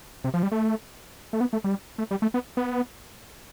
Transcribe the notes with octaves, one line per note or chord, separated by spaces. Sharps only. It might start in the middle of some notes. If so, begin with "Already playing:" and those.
C3
F3
G3
A3
A3
B3
A3
G3
A3
G3
A3
B3
B3